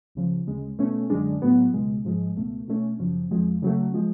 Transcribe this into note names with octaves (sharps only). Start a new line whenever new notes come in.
C#2 C#3 F3
D2 C#3 G#3
B2 A3 C#4
F#2 D3 G#3 D4
A2 F#3 B3
C#2 B2 G#3
G#2 F3 G#3
C#2 B2 A3
B2 A3 C#4
F#2 C#3 F3
F2 F3 G#3
C#3 F#3 A3
F3 G#3